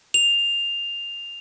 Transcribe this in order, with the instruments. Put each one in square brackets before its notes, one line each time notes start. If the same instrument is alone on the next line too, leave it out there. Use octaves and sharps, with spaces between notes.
[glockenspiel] F7